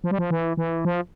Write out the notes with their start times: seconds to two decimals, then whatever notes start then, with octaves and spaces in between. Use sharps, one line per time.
0.04 F3
0.11 G3
0.18 F3
0.31 E3
0.57 E3
0.85 F3